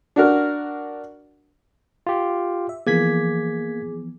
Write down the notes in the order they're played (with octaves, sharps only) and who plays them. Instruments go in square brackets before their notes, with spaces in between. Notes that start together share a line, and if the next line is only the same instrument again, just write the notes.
[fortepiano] D4 F#4 A#4
[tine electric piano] F4 G4
[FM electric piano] E5
[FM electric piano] E3 F3 B3 [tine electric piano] A#3 G#6 B6 [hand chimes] G#4